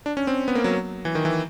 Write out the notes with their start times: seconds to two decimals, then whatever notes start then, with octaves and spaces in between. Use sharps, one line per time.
0.06 D4
0.17 C#4
0.27 C4
0.48 B3
0.55 A#3
0.64 F#3
1.05 E3
1.15 D#3
1.25 E3